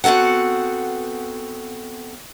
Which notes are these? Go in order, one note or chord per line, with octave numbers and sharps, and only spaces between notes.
B3 C4 F#4 A4 F#5